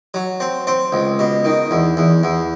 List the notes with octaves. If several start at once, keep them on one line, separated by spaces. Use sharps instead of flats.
F#3
C4
C4
C#2
B2
D#3
E2
E2
E2